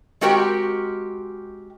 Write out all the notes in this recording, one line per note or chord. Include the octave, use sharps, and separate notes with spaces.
G#3 C4 F#4 G4 A#4 G5